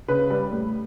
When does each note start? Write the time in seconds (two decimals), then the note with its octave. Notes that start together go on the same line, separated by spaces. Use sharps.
0.08 C#3 B4
0.30 G3
0.52 A2